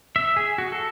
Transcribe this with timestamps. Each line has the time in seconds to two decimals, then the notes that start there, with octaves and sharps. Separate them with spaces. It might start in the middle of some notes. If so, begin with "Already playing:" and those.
0.16 E5
0.36 G#4
0.58 F#4
0.72 A4